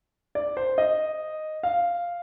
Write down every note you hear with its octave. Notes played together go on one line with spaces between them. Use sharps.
D5
C5
D#5
F5